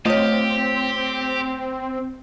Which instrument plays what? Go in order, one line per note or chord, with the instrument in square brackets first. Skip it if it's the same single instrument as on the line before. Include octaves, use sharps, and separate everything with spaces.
[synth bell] A3 C#5 [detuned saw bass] C4 [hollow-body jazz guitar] F4 D#5 [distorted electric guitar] G4